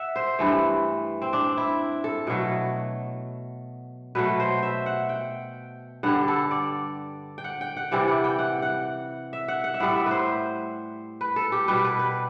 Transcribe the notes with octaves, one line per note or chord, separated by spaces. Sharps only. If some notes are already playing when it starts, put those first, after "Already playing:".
Already playing: E5 F#5
C5
G2 E3 A3
C4
D4
E4
A4
B2 F#3 A3
B2 F#3 A3 B4
C5
E5
F#5
G5
G2 D3 G3 F#5
A4
D5
G5
F#5
G5
F#5
C3 E3 G3 F#5
F#5
G5
F#5
F#5
E5
F#5
F#5
E5
A2 G3 F#5
E5
B4 C5
B4
A4
G4
B2 G3 B4
B4
B4